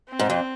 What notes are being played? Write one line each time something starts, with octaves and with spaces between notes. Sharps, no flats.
C4
G#2
F2